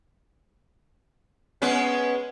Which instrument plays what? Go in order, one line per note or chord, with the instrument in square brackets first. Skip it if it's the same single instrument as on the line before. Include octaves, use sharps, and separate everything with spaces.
[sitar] G#3 B3 C#4